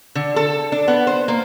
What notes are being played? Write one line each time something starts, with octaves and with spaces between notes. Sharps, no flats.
D3
A4
D4
B3
C5
A#3